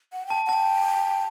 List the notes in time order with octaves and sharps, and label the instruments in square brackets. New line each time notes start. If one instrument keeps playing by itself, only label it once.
[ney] F#5
[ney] G5 [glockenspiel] A5
[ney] F#5
[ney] G5 [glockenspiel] A5